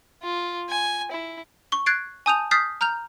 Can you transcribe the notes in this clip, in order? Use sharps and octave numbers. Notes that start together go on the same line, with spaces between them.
F4
G#5
E4
C#6 G7
F#6 G#6 A6 C7 D7
G#5 A5 D#6 G6 D#7 F7
D#6 F6 G6 A6 B6 C7
A#5 F6 G6 F7